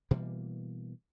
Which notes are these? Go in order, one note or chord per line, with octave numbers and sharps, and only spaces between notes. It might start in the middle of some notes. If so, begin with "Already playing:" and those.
B2 E3 G3 A#3